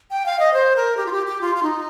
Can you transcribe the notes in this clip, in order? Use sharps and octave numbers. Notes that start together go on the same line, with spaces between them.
G5
F5
D#5
C5
A#4
G4
F4
G4
G4
F4
F4
D#4